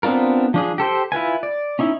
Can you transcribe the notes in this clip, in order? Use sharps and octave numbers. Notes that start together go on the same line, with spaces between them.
B3 C4 D4 F4 A#4
F3 D4 G#4
G4 A4 C5 G5
E4 F4 B4 G#5
D5
C#4 D#4 E4